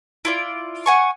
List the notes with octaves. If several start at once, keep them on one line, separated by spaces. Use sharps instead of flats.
E4 F4 D5
F#5 G#5 C#6